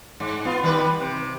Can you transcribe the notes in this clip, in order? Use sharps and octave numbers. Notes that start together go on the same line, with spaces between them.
G#2
B3 F4
D#3 G3 B4
C3